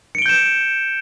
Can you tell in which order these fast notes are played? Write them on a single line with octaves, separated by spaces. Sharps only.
C#7 D7 G7 G6 E7